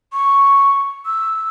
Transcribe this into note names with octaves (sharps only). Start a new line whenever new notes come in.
C#6
E6